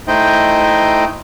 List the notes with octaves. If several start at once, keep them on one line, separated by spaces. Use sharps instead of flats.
A3 D#4 E4 C5 D#5 G5